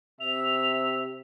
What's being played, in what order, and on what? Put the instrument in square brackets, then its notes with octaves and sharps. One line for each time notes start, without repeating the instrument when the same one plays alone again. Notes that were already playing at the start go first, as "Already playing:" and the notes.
[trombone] C3 [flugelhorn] E5 [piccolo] F7